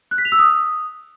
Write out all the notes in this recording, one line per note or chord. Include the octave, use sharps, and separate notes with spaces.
F#6
B6
F7
E6
D#6